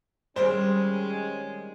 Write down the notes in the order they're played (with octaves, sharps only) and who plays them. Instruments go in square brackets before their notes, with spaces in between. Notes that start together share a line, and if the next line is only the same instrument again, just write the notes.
[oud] D#3 G3 C4 [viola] G#3 [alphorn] C#4 [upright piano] C5